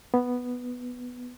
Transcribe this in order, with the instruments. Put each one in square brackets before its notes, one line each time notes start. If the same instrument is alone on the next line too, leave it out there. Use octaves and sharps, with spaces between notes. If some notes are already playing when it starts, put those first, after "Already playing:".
[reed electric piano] B3